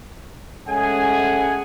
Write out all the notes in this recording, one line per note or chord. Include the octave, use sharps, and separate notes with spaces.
G#3 A3 C#4 G#4 F#5 G#5